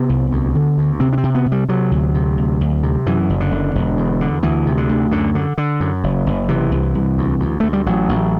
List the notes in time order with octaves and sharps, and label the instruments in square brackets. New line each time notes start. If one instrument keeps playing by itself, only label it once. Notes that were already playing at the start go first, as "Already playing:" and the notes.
Already playing: [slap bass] C3 B3
C2
D2
D3
D2
C3 C4
D4
C4
C3
B3
C3
G3
C3 F#3
D2
C3
D2
D2
C3
F#2 E3
F#1
D3
F#1
E1
E2
D3
D2 E3
C3
D3
D2
F#2 D3
D3
D3
F#2
F#1
F#1
C3 E3
C2
C2
D2
D2
D2 A3
G3
A1 F#3
A1